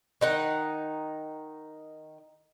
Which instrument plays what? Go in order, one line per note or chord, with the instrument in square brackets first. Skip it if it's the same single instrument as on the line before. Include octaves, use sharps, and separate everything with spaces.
[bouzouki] D#3 D#4 F#5